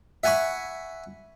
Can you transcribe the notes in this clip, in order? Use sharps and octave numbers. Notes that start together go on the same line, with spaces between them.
E5 F#5 G#5 B5 C#6